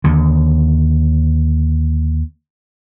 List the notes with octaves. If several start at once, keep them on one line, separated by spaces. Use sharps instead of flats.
D#2 D3